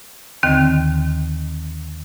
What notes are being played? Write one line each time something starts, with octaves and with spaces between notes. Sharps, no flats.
D#2 D3 D#3 C4 D#5 G5